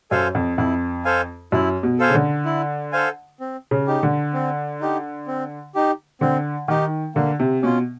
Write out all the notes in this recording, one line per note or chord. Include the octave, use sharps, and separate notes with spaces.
F#2 A4 C5 F5 G#5
F2
F2 E4
A4 C5 F5 G#5
F#2 E4
B2
A4 C5 F5 G#5
C#3
D3
E4
A4 C5 F5 G#5
C4
C#3
D#4 G4
D3
C4
D#4 G4
C4
D#4 G4
D3 C4
D#3 D#4 G4
D3 A#3
C3
B2 C#4 F4